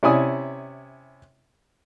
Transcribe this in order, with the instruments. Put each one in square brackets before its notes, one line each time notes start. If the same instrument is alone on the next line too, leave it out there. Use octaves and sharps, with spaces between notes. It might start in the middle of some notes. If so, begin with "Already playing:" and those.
[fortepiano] C3 C#4 E4 D5 G#5 D#6